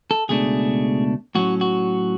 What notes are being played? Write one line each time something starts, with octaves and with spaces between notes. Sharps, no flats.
A4
C#2 B2 A3 D4 G#4
A2 F#3 C#4 F#4
F#4